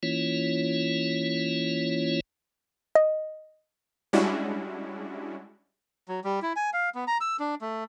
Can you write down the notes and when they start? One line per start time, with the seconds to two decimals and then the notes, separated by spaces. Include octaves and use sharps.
0.03 E3 A#3 C#4 E4 F4 C#5
2.95 D#5
4.13 G3 G#3 C#4 D4 E4 F#4
6.08 F#3
6.24 G3
6.42 E4
6.56 G#5
6.73 F5
6.95 B3
7.08 A#5
7.21 E6
7.40 D4
7.61 A3